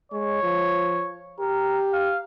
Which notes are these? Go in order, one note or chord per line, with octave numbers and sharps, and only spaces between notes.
G#3 C#5
F3
G4 A#4
F5